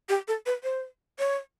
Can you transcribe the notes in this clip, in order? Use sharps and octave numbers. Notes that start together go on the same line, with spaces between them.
G4
A4
B4
C5
C#5